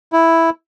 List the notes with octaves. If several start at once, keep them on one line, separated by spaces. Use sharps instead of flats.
E4